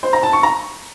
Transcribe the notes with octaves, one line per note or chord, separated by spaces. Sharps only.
C5
A#5
A5
C#6
A#5